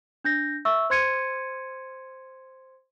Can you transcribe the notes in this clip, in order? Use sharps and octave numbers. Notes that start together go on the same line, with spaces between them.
D4 G6 A#6
E5 C#6 E6
C5 C6 G#6 C#7 D#7